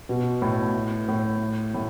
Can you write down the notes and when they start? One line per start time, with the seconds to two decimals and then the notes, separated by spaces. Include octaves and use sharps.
0.09 B2
0.42 A2
1.08 A2
1.74 A2